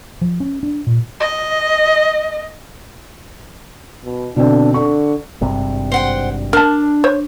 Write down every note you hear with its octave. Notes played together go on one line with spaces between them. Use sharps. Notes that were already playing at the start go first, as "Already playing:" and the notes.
F3
C#4
D4
A#2
D#5
B2
B2 D3 C4 D4
D3 C#6
G#1 G2 C3
C5 F#5 G5
D4 A#4 A5
C5 C#5